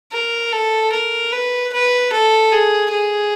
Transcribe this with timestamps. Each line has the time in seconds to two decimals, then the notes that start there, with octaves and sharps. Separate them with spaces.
0.12 A#4
0.53 A4
0.93 A#4
1.33 B4
1.73 B4
2.13 A4
2.52 G#4
2.92 G#4